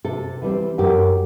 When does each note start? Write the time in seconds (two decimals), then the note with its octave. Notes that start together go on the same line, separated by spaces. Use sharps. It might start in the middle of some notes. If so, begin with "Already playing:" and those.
0.05 C3 A4
0.42 E3 G3 C4
0.78 F#2 G4